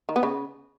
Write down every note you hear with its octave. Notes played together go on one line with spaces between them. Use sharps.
D#3
B3
C#3